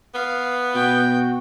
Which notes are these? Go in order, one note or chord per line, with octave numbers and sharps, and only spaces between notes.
B3 F5
B2 F#4 G5